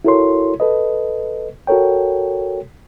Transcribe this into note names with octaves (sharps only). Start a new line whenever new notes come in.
E4 F#4 A4 A#4 C#5 C6
A4 B4 D#5
F#4 A4 A#4 C#5 G5